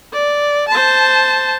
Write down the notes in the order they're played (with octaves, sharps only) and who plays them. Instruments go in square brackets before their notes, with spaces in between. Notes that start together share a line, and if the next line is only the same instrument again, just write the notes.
[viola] D5
C5 A5